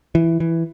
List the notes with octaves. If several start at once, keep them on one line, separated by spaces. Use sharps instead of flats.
E3
E3